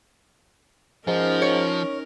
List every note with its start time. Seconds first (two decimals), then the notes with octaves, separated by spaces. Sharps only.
1.07 G#2 F3 C#4 D#4 A#4
1.42 C#5